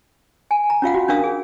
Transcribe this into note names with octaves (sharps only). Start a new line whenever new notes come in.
G#5
A#5
C#4 F4 F5 F#5
F#4
C#4 D4 A#4 F5 D#6
G#4